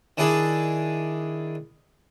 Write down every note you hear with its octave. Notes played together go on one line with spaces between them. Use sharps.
D#3 D4 E4 G#4 D5